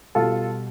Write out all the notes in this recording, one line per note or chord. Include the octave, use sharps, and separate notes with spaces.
B2 G3 F4 A4